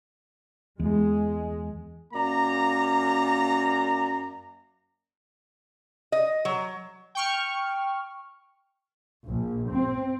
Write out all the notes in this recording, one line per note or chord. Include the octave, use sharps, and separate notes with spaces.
E2 G#3
F#2 A#3 D5 A#5
D#5
F#3
G5 C#6 F6
A#1
C4